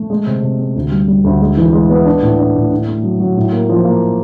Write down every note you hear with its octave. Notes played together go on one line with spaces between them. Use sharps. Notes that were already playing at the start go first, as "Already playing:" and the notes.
Already playing: A3
G#3
C3
C3
G#3
D2
G3
G3
D2
G#3
E3
G#3
B3
D4
A2
D4
A2
D4
A3
F#3
F#3
A2
A#3
F3
A#3